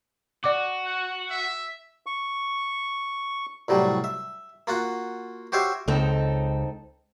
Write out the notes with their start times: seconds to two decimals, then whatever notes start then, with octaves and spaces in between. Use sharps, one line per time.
0.44 F#4 D5 D6
0.85 F#5
1.30 E5
2.06 C#6
3.68 C2 A2 F#3 G3
4.04 E5
4.67 A#3 F4 F#4 F#5
5.52 F#4 G4 C5 C#5 E5 F5
5.88 C#2 C4 D#4 A4